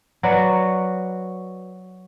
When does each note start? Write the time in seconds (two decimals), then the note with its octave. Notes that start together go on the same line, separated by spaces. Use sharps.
0.23 F#3 F#4 B4 D5